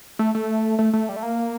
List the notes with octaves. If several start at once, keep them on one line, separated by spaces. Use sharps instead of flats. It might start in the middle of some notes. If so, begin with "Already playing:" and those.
A3
A3
A3
A3
G3
A3
A#3